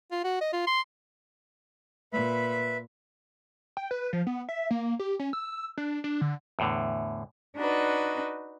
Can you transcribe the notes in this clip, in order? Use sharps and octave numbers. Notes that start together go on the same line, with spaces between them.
F4
F#4
D#5
F4
C6
A#2 B4 E5 B5
G5
B4
F3
B3
E5
A#3
G4
C#4
E6
D4
D4
D3
E2 A2 D3
D4 D#4 F#4 B4